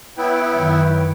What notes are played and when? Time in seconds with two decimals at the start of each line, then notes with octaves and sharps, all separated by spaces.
0.18 B3 E4 B4 C#5 G5
0.54 F#2 D#3